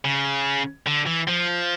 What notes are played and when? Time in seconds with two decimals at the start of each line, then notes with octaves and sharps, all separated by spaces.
0.05 C#3
0.87 D3
1.07 E3
1.28 F3